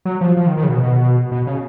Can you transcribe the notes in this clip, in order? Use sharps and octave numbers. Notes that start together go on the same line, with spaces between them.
F#3
F3
F3
D#3
D#3
C#3
B2
B2
B2
C#3